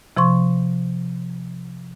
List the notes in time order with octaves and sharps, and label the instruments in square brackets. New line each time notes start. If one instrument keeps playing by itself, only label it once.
[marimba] C3 F3 C6 C#6